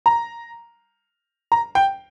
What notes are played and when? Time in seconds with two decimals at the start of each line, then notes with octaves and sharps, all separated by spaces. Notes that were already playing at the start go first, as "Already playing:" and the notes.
0.06 A#5
1.52 A#5
1.75 G5